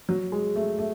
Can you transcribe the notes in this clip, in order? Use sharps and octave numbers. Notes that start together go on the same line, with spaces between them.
F#3
G#3
A3
A3